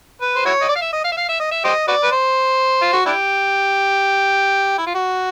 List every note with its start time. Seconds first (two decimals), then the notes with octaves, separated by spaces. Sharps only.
0.22 B4
0.36 C5
0.46 E4 F#4 C#5
0.61 D#5
0.69 D5
0.76 F5
0.82 E5
0.93 D#5
1.04 F5
1.12 E5
1.17 F5
1.29 E5
1.40 D#5
1.52 E5
1.65 G4 C5 D#5
1.88 F#4 B4 D5
2.03 B4
2.12 C5
2.82 F4
2.93 F#4
3.06 D4 E4 G4
4.78 E4
4.87 F4
4.95 F#4